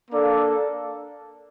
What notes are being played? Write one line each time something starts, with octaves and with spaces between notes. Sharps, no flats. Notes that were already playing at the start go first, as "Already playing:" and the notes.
A#3 D4 A4 D5 F5